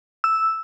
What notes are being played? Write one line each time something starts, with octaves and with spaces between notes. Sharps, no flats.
E6